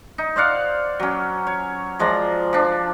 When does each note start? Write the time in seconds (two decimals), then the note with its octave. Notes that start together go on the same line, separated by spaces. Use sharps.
0.18 D#4
0.36 C5 D5 F5 F#5
1.00 F#3 C#4
1.47 C#5
1.99 F3 G#3 D5 A#5
2.53 F3 D4